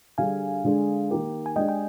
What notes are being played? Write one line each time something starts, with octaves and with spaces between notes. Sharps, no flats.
D3 G3 D4 G#4 F5 G#5
D3 G#3 D4 G#4
D#3 A#3 D#4 G4 A#4
G#5
G#3 D4 G4 D#5 G5
G5